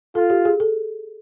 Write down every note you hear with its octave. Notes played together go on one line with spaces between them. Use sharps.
F4 A4
G4
G#4
A4